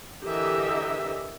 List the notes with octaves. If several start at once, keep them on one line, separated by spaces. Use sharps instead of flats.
D3 E3 G4 A#4 D#5 E5